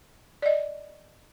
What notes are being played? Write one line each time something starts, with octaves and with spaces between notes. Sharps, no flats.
D5 D#5